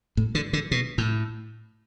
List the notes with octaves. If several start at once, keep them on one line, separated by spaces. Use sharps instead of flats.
A2
D3
D3
B2
A2